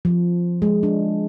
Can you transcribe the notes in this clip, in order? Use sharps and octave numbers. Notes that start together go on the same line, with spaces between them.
F3
G#3
D4